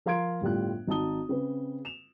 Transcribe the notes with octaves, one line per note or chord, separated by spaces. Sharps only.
F3 A#4 F5 C6 G#6 D7
G1 A2 G3 F4 F5 F#6
G#1 D#4 F#4 A5 D#6 G7
C#3 C4 B4
E7 F7